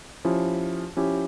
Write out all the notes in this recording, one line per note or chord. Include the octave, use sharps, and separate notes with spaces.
F3 C#4 E4 G4
F3 C#4 E4 G4